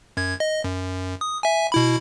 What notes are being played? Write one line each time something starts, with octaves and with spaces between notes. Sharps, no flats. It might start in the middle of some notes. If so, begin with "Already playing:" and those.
F#2 G#6
D#5
F#2
D#6
E5 G#5
B2 E4 B5